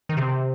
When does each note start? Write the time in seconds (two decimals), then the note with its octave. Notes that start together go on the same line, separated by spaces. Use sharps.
0.09 D#3
0.17 C3